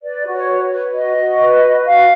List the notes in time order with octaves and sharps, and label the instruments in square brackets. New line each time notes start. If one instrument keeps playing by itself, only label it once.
[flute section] B4 D5
F#4
C#5
B4
B4
F#4 D#5
F#4
B4
F#4
F#4 F5